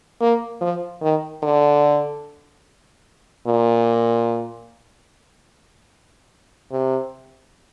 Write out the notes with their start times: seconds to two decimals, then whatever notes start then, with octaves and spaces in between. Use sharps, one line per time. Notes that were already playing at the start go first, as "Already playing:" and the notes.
0.21 A#3
0.61 F3
1.02 D#3
1.43 D3
3.47 A#2
6.72 C3